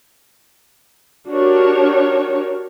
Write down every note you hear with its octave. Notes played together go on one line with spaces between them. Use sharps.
D4 F#4 G4 A#4 C#5